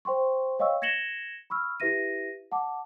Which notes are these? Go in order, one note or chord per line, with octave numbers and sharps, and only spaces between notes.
C5 G5 C6 C#6
C#5 D#5 F5 G5 C#6 E6
G#6 A#6 C#7 E7 F#7 G7
B5 C#6 E6 F6
E4 G4 B4 E5 A#6 D#7
F#5 A5 D6